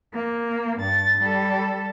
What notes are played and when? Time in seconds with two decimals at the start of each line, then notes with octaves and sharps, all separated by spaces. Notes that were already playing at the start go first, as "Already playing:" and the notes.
0.14 A#3
0.80 G2 A6
1.19 G3 A4